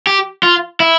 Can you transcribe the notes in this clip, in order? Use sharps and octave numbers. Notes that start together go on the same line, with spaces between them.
G4
F4
E4